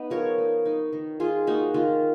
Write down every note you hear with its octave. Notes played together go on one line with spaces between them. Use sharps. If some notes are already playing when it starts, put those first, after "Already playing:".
Already playing: B3 D#4 D#5
F3 A#4 C#5
D#4
D#4
D#3
D#3 F4 G#4
A#3 D#4 F#4
D#3 F4